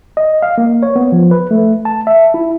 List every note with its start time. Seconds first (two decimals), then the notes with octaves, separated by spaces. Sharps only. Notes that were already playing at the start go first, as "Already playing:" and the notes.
0.17 D#5
0.42 F5
0.58 A#3
0.83 C#5
0.96 B3
1.12 F3
1.31 B4
1.51 A3
1.85 A5
2.07 E5
2.34 E4